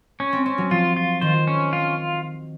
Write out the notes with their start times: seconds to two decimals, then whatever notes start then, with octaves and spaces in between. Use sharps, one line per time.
0.20 C#4
0.33 C4
0.46 C4 C#4
0.58 F#3
0.71 F3 F4
0.97 F4
1.21 D#3 C5
1.47 C#4
1.73 F4